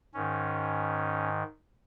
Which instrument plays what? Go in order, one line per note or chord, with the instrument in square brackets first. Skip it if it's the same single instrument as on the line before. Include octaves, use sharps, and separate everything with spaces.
[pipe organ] G#2 D#3 C#4